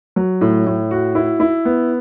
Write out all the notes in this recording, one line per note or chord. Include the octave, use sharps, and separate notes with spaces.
F#3
A2
A2
F#4
E4
E4
B3